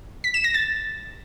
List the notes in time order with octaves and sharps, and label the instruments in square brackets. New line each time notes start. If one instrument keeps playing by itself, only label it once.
[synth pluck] B6
E7
A#6
A6